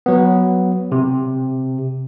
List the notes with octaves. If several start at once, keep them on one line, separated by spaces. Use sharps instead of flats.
F#3 B3
C3